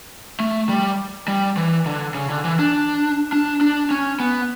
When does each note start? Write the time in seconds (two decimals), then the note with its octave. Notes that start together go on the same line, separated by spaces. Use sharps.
0.40 A3
0.69 G3
1.28 G3
1.57 E3
1.86 D3
2.15 C#3
2.29 D3
2.45 E3
2.59 D4
3.33 D4
3.61 D4
3.91 C#4
4.20 B3